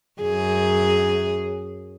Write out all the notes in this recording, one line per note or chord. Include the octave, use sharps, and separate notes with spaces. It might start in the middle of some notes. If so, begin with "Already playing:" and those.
F#2 G#4